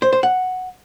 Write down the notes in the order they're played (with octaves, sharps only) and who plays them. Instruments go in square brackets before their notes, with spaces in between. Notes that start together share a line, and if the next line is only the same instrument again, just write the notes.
[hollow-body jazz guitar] C5
C5
F#5